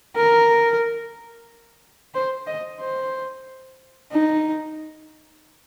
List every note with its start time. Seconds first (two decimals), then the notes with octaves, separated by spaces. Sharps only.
0.17 A#4
2.15 C5
2.47 D#5
2.80 C5
4.12 D#4